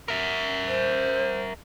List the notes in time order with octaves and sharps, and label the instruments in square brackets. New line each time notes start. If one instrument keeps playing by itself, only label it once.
[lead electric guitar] A#4 E5
[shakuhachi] C5